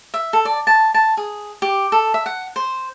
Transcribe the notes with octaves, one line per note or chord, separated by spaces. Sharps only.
E5
A4
D5
A5
A5
G#4
G4
A4
E5
F#5
C5